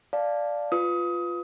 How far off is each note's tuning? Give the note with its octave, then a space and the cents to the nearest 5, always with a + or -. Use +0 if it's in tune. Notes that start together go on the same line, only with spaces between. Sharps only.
D5 +0 F5 +0 A5 -5
F4 +0 B4 +15 D#6 +25